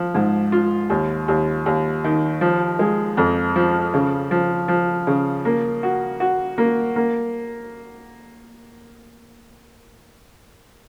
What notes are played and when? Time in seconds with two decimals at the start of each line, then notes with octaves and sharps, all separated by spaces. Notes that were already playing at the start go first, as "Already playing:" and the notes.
Already playing: F3
0.15 G#2
0.52 F4
0.90 D#2
1.28 D#2
1.66 D#2
2.04 D#3
2.41 F3
2.79 G#3
3.17 F2
3.56 F3
3.94 C#3
4.31 F3
4.68 F3
5.07 C#3
5.45 A#3
5.83 F#4
6.20 F#4
6.58 A#3
6.96 A#3